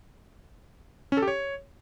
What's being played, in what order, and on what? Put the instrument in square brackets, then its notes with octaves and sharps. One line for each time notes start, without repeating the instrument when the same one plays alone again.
[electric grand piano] C#4
A4
G4
C#5